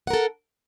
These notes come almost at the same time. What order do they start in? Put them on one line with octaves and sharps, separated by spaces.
F#5 A#4 A4